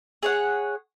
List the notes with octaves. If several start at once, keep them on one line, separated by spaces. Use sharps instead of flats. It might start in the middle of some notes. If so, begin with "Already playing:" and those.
G#4 C#5 F#5